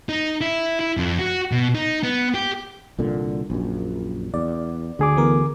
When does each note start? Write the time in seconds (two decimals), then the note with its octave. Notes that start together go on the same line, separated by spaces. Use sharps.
0.09 D#4
0.41 E4
0.80 E4
0.97 F2
1.19 F#4
1.52 B2
1.75 D#4
2.03 B3
2.34 G4
2.99 C2 A#2 D3
3.50 A#1 F#2
4.34 E2 D5
4.99 D2 D3 G#4 D6
5.16 E3 B3 A#4